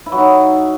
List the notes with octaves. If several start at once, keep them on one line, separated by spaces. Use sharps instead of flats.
E4
F#3
D#4